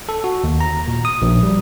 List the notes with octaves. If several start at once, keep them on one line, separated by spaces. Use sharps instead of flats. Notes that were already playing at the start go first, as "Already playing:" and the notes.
A4
F#4
D#2
A#5
A#2
D#6
A#1
G3